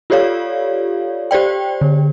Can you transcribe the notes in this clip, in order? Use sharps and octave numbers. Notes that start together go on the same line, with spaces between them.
F4 G4 A4 C#5 D5 F5
G4 C5 D5 G5
D3